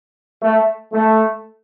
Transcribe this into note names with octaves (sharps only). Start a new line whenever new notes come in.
A3
A3